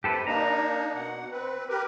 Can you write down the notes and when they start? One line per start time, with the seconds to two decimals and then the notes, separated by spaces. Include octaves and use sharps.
0.04 C3 G4 A4 B4
0.27 A#3 D4 D#4 A#5
0.94 B2 F#5
1.32 C4 B4
1.69 G4 A#4 B4